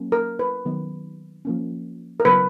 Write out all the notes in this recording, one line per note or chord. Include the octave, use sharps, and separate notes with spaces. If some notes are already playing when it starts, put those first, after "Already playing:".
Already playing: F#3 A#3 C#4
A#4
B4
D#3 F#3 B3
F3 A#3 C#4
A#4
C#3 F#3 B3 B4